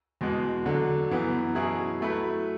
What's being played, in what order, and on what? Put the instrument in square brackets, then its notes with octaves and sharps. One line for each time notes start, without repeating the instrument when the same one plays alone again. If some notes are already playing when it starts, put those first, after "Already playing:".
[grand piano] E2 B2 G#3
D2 D3 F#3
F#2 E3 B3
B2 F#3 C#4 E4 G#4
F#3 A3 E4 B4